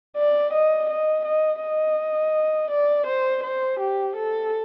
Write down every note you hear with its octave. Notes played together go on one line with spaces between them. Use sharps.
D5
D#5
D#5
D#5
D#5
D5
C5
C5
G4
A4